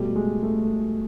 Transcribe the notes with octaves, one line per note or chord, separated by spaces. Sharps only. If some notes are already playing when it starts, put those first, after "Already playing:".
Already playing: B2 G3 A3
G#3
A3